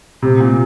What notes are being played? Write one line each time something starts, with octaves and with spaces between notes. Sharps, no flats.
C3
A#2